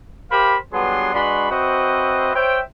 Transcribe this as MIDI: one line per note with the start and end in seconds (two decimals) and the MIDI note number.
0.31 0.56 67
0.31 0.56 70
0.31 0.56 72
0.31 0.56 77
0.31 0.56 83
0.73 1.13 43
0.73 1.13 54
0.73 1.13 59
0.73 1.13 62
0.73 1.13 68
0.73 1.13 84
1.14 1.49 56
1.14 1.49 62
1.14 1.49 66
1.14 1.49 71
1.14 1.49 83
1.14 1.49 84
1.50 2.33 60
1.50 2.33 66
1.50 2.33 71
1.50 2.33 72
1.50 2.33 75
1.50 2.33 76
2.35 2.60 72
2.35 2.60 73
2.35 2.60 76
2.35 2.60 79